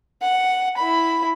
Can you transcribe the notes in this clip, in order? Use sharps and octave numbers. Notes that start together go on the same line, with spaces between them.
F#5
E4 B5